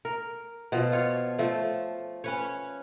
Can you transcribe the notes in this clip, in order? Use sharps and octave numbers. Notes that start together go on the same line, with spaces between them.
A#4
B2 F3
F4 C#5
F3 A3
C#4 B4 C#5